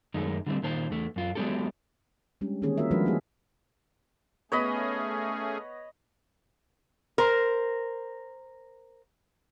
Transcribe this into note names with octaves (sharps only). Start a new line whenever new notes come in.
F#2 D#3 G#3 A3 D#4
D3 G3 A3 C4
A#2 D#3 C5 A5
E2 A3
F#2 F4
F#3 G#3 B3 C#4 G4 A4
G3 G#3 C#4 D4 G4
D3 D#3 A#3 C4 C#4 G#4
A#3 F4 F#4 A#4 E5
F3 G3 G#3 D4 F#4 B4
A#3 B3 G4 G#4
A3 B3 C#4 G#4 C#5 D#5 B5
A#4 C5